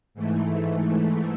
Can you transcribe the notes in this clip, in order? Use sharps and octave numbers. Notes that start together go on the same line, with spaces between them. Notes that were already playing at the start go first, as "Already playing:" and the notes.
G#2 E3 A3